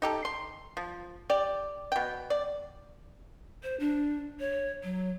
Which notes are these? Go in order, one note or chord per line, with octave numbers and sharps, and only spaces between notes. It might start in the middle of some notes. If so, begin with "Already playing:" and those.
D#4 G4 A4
C6
F3
G4 D5
B2 G5
D5
C5
D4
C#5
F#3